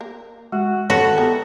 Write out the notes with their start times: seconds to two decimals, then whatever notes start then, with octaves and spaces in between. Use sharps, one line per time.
0.01 A#3
0.52 G#3 F#4
0.90 F#4 A4 B4 C#5
1.17 B3 E4 A#4